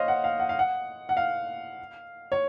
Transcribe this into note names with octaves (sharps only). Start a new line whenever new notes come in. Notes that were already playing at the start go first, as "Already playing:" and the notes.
Already playing: C5 C#5 D#5 F5
F#5
F5
F#5
F5
F#5
F#5
F5
C#5